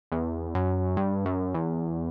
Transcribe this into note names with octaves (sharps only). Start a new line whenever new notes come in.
E2
F#2
G2
F#2
E2